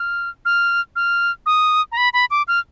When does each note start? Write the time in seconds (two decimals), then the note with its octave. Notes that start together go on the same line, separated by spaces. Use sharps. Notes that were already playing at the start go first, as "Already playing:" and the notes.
Already playing: F6
0.45 F6
0.96 F6
1.46 D#6
1.92 A#5
1.97 B5
2.13 B5
2.31 D6
2.48 F6